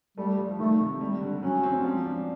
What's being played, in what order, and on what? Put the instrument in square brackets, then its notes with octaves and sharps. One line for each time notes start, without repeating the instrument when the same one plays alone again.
[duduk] G3 [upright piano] A3
[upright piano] F3
[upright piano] D#3 [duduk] A3
[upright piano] C3
G3
D3
[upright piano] F#3 [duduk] C#4
[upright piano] C4
F3
D4